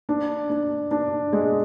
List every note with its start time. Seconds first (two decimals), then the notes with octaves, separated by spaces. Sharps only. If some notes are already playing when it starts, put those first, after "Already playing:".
0.09 D4
0.50 D4
0.91 D4
1.33 G#3